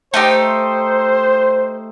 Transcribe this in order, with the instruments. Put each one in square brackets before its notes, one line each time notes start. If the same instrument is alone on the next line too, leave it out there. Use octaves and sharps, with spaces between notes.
[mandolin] A3 D#4 G4 [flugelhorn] C5